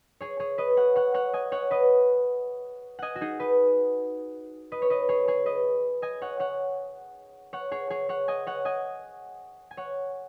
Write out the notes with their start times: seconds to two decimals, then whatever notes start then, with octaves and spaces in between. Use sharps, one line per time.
0.21 G#4 C#5
0.40 G#4 C#5
0.58 B4 D#5
0.77 C#5 F#5
0.96 C#5 F#5
1.14 C#5 F#5
1.33 D#5 G#5
1.52 C#5 F#5
1.71 B4 D#5
2.99 D#5 F#5 G#5
3.16 F#4
3.21 D#4 G#4
3.40 B4 D#5
4.72 B4 D#5
4.82 C#5
4.90 B4 D#5
5.09 G#4 C#5
5.28 G#4 C#5
5.46 B4 D#5
6.02 D#5 G#5
6.22 C#5 F#5
6.40 C#5 F#5
7.53 C#5 F#5
7.72 G#4 C#5
7.90 G#4 C#5
8.09 C#5 F#5
8.28 D#5 G#5
8.47 C#5 F#5
8.65 D#5 G#5
9.71 G#5
9.77 C#5 F#5